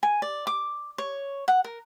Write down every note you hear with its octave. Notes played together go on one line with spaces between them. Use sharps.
G#5
D5
D6
C#5
F#5
A#4